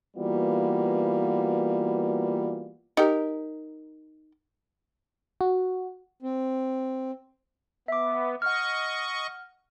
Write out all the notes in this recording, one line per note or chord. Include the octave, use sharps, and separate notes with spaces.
E3 G3 A#3 B3 F4 F#4
D#4 G4 A#4
F#4
C4
B3 E5 D6
D#5 F#5 C#6 F6